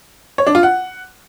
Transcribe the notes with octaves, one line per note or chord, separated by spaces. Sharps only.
C#5
D4
F4
F#5